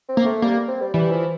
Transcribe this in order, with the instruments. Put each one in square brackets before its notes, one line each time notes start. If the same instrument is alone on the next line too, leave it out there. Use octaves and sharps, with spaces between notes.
[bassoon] C4
[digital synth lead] A#3
[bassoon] A3
[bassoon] G3 [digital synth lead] A#3
[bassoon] C4
G3
[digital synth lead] E3 [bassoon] G3
[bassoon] F3